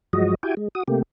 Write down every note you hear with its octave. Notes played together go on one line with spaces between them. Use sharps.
G2 F3 F#3 G#3 F#4 D#5
E4 F#4 G4 G5 G#5
G#3
F#4 D#6
C3 A3 A#3 G4